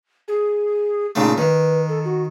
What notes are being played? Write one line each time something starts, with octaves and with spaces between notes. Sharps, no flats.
G#4
A#2 C#3 A3 D#4
D#3 B4
A4
F#4